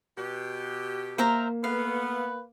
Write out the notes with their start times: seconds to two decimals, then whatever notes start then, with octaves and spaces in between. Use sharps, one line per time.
0.17 B2 G4
1.18 A#3 A#4 C5 E5 A#5
1.64 A3 B3 B4 F5